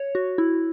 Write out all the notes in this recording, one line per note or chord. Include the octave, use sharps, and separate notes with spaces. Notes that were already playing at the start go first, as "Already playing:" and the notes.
Already playing: C#5
F#4
E4